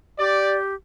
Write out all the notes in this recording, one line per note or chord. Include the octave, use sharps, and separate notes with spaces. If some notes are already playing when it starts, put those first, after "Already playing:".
G4 D5